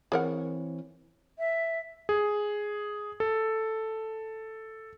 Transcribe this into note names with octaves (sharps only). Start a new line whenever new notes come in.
E3 C4 G#4 A#4 C#5 F#5
E5
G#4
A4